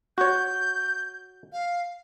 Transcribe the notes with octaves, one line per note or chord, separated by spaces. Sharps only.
F#4 C#5 G6
F5